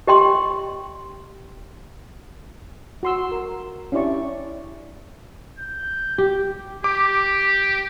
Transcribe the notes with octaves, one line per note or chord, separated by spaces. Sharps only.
G4 D#5 G5 C6
F#4 C6 E6
A#4
C#4 D4 E4 G4 D5 C#6
G6
G4
G4 D6